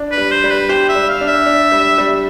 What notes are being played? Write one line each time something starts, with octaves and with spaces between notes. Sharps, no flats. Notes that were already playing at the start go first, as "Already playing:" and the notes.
Already playing: D4
B4
G3
C5
G3
B4
G4 C5
E5
G3
F5
D4
E5
D4
G3
G3